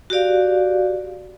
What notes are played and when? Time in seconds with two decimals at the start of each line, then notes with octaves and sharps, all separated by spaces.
0.10 F#4 G4 D5 F5